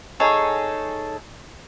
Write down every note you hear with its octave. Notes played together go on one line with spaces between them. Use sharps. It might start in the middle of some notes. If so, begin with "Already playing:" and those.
D#4 G#4 A4 C#5